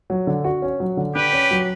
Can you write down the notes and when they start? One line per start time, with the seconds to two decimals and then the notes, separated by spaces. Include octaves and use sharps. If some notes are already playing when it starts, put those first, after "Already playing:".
0.10 F#3
0.27 D3
0.44 F#4
0.62 C#4
0.80 F#3
0.97 D3
1.15 D3 G4 B4
1.33 C#4
1.51 F#3